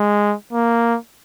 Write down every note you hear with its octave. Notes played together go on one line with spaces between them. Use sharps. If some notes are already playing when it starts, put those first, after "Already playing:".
Already playing: G#3
A#3